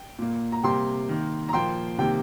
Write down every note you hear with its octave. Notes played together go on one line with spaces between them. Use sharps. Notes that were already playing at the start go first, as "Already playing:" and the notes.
Already playing: G5
A#2 A#3
A#5
C3 G3 A#3 G5 C6
D#3 A#3
A#5
A#2 F3 A#3 G5 C6
C3 D#3 G3 A#3 G5